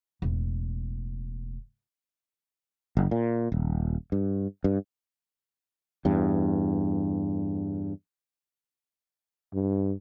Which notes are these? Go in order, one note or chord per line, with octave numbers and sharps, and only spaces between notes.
E1 A2
F#1
A#2
D#1
G2
G2
E2 G2
G2